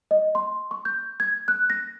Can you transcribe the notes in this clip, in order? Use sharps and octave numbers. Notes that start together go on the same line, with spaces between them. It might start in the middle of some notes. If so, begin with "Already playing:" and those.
D#5
C6
C#6
G6
G#6
F#6
A#6